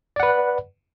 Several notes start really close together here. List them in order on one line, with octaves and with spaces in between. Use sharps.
D5 F#5 B4